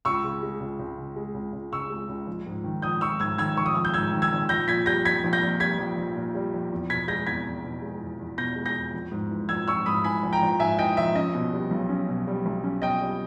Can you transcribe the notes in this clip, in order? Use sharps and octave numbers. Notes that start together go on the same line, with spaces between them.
C#2 C#6 E6
C#3
G#3
C#2
C#2
C#3
G#3
C#2
C#2
C#3 C#6 E6
G#3
C#2
A#1
G#2
D#3
A#1 D#6 G6
A#1 C#6 E6
G#2 E6 G#6
D#3 E6 G#6
A#1 C#6
D#6
A#1 E6
G6
G#2 E6 G#6
D#3
E6 G#6
A#1
A#1 G6 A#6
A#2 G#6 B6
G3 G6 A#6
A#1 G#6 B6
A#1
G6 A#6
A#2
G3 G#6 B6
A#1
A#1
A#2
G3
A#1
E2
B2 G#6 B6
G#3 G6 A#6
E2 G#6 B6
E2
B2
G#3
E2
E2
B2 G6 A#6
G#3
G6 A#6
E2
A#1
G#2
E3
A#1 E6 G#6
A#1 C#6 E6
G#2 B5 D#6
E3 G#5 B5
A#1
G5 A#5
A#1
G#2 E5 G#5
E3 D#5 G5
A#1 E5
C#4 D#5
B2
G3
B1
C#4
B2
G3
B1
C#4
B2 D#5 G5
G3